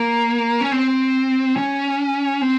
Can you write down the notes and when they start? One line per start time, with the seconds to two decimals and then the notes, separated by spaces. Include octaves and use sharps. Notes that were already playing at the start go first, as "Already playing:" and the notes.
Already playing: A#3
0.61 C#4
0.72 C4
1.57 C#4
2.42 C4